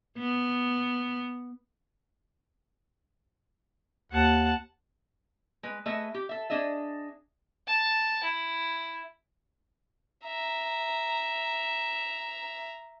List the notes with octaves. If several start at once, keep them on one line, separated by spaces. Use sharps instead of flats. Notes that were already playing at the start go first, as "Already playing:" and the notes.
B3
D#2 F#5 A5
G#3 B4
A3 G#4 B4 D#5 E5
G4
A4 E5
D4 G#4 D#5 E5
A5
E4
E5 A#5